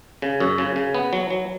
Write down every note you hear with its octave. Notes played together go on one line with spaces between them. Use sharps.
C#3
F#2
C#3
C#3
B3
F#3
F#3